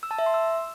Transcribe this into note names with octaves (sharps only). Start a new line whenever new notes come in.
E6
A5
E5
C6
E6